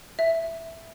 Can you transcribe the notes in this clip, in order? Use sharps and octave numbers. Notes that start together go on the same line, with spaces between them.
E5